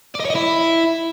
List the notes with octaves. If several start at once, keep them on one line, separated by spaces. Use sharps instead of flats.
D5
D#5
C#5
D#5
E4